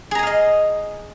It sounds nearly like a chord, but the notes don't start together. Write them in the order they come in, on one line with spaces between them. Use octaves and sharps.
G#4 A#5 G#5 F5 D#5